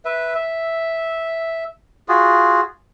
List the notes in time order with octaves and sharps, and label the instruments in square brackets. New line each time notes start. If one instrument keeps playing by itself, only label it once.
[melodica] B4 E5
E5
F4 F#4 G#4